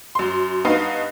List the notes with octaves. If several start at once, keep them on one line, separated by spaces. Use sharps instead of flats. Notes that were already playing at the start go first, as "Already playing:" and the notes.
F#2 C6
G2 B3 D#4 F5